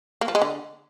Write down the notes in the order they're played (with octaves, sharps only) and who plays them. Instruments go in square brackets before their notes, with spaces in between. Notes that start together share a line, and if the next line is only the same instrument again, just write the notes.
[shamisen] A#3
F3
G#3
D3